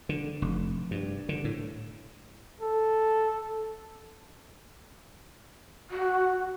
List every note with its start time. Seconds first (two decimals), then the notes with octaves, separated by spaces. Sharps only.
0.09 D3
0.42 F1
0.91 G2
1.29 D3
1.45 A2
2.61 A4
5.90 F#4